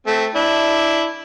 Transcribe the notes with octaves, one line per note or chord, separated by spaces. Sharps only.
A3 C4
D4 E4